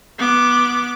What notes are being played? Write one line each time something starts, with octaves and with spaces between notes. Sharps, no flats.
B3 D6